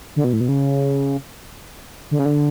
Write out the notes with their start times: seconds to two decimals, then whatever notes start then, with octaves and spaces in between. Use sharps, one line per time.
0.16 D3
0.24 B2
0.33 A2
0.40 B2
0.49 C#3
2.11 D3
2.19 C#3
2.25 D3